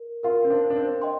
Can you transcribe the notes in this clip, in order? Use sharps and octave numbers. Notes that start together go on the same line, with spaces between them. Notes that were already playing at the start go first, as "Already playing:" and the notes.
Already playing: A#4
F4 A#4 F5 C6
C4
D4
D4
C4
D#5 G5 C6